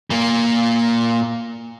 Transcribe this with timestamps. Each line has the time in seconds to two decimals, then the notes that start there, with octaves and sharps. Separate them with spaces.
0.10 A#2 A#3